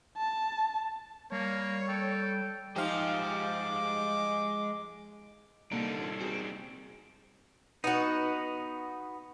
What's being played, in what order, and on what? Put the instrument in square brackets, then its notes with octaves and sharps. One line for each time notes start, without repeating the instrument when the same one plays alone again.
[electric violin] A5
[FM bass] G3 [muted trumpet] A#3 [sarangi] C#5
[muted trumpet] A4 [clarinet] G5
[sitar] F3 D#4 [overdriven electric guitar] G#3 C5 [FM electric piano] G4 F5 [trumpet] D6
[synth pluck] C3 A#3 C#7 [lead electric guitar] G3 D#4 [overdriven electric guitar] D4 A4 [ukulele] A#5
[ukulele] F4 C#5
[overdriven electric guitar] C4 [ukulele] F#4 G#4 A#4
[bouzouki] B3 F#4 [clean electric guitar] D#4